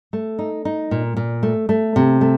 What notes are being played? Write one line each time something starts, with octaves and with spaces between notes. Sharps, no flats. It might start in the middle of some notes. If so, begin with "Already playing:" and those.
A3
D#4
D#4
A#2
A#2
A3
A3
C3
A3